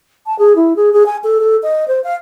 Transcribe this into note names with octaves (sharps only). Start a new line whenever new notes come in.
A5
G#4
E4
G#4
G#4
G#5
A4
A4
D#5
C5
F5